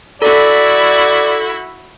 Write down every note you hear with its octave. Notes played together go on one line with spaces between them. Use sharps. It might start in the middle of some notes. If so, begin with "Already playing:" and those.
E4 F#4 A4 D5 B5